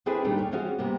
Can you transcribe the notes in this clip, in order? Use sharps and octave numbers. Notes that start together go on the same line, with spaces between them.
C4 D4 E4 G#4 A4 B4
A#2 D#3 G3 A3 D4 G5
D#2 C#4
E3 C4 C#4 F4 F#4 G#4
C3 G3 A#3 B3